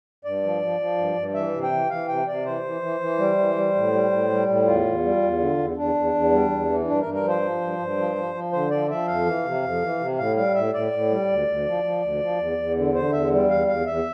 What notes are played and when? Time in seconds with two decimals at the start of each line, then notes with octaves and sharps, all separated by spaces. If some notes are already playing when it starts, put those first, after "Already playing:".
0.25 G2 D5
0.44 F3
0.62 F3
0.80 F3
0.98 G2
1.16 G2
1.34 E3 E5
1.53 C3
1.63 G5
1.72 E3
1.90 E3 F5
2.08 C3 G5
2.27 C3 D5
2.45 E3 C5
2.64 E3
2.82 E3
3.00 E3
3.18 G3
3.38 E3
3.56 G3
3.75 A2
3.92 G3
4.11 A2
4.30 G3
4.48 A2
4.66 E2 F4
4.85 E2
5.03 G3
5.22 E2
5.39 D3
5.58 E2
5.76 E2 D4
5.94 E2
6.14 E2
6.32 G3
6.51 E2
6.69 E3
6.87 G2 D4
7.01 G2 A#4
7.14 A#4
7.23 F3 C5
7.42 F3
7.61 G2
7.79 G2
7.97 F3
8.15 F3
8.34 F3
8.52 D3 C5
8.71 F3 D5
8.89 F3 E5
9.07 F2 F5
9.26 E3
9.45 C3
9.62 F2
9.82 E3
9.99 C3
10.18 A2 F5
10.36 G3 F5
10.55 A2 E5
10.74 A2 D5
10.92 A2
11.10 G3
11.29 D2
11.48 D2
11.66 F3
11.84 F3
12.02 D2
12.21 F3
12.39 E2
12.58 E2
12.76 D3
12.94 D3 C5
13.12 E2 E5
13.31 G3
13.49 E2 F5
13.67 E2 F5
13.86 E2 E5